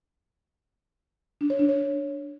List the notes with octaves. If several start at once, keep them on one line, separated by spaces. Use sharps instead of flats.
D4
C#5
D4
C#5